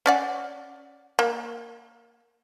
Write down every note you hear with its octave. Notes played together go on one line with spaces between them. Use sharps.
C#4 D5 F#5
A#3